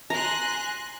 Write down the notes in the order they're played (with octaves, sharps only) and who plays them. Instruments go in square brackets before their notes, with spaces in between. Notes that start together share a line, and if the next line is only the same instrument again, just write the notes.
[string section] G#5 C6 F#6 [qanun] A#5